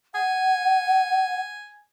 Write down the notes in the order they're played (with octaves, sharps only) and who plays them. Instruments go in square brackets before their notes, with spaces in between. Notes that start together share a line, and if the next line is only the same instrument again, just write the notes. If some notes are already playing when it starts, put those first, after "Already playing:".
[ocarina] F#5 [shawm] G#5